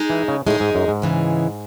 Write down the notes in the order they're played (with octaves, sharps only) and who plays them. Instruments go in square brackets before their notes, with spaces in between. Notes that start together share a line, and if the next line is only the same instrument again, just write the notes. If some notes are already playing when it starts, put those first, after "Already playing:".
Already playing: [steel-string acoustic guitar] G#3 D#4 G#4
[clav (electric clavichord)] E3
C#3
[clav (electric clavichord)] A2 [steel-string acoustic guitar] G#3 D#4 G#4
[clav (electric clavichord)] G#2
F#2
G#2
[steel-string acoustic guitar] C#3 E3 G#3